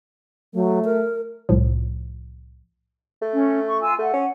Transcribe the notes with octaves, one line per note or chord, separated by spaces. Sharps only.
F#3 A3
A#4
C2 A2 F3
A3
C#4
C#6
F4 G#5 E6
A3 F#5
C#4